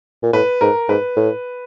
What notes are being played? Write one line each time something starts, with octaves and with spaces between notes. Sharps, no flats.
A#2
A2 B4
G#2 A#4
G#2 B4
A2